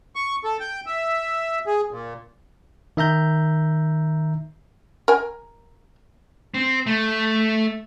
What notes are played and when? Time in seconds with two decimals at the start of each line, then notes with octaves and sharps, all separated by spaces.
0.16 C#6
0.44 A4
0.60 G5
0.86 E5
1.67 G#4
1.91 A#2
2.97 D#3 E5 A#5 G6
5.08 A#4 G#5
6.54 C4
6.87 A3